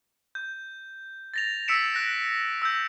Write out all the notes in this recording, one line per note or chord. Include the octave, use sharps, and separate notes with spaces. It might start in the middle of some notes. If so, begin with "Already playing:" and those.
G6
A6 A#6 F7
E6 A#6 B6 C#7 D7 E7
F#6 A#6
E6 G6